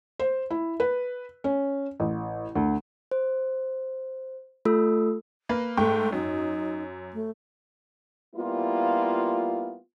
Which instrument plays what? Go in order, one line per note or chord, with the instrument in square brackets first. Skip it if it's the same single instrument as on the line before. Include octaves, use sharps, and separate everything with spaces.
[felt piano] C5
E4
B4
C#4
A1
D2
[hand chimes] C5
A3 F4 A4 E6
[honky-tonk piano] A#3 B4
[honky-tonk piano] G#2 G5 C#6 [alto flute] A3
[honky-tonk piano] F#2 [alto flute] D#4
[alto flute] A3
[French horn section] G3 A#3 B3 E4 F4